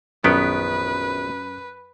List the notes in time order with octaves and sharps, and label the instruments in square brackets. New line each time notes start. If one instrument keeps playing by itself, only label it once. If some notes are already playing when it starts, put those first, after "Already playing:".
[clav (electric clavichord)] A#1 D#3 B3 [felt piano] F#2 B6 D7 [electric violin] B4